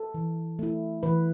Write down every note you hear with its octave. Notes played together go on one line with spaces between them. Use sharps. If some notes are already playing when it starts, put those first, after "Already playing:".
Already playing: A4
E3
A3 E4
E3 B4